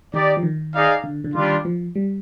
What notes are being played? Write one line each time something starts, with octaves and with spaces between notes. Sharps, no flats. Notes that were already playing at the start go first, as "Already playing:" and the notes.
D#3 D#4 G4 D5
F3
D#3
D#4 G#4 D5 F5
D3
D3
D#3 G3 D4 F4
F3
G3